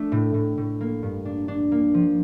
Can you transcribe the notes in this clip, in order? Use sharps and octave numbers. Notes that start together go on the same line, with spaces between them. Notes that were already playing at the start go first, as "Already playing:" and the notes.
Already playing: A3 D4
A2
A2
A2
A#3
G2
D4
D4
A#3
F3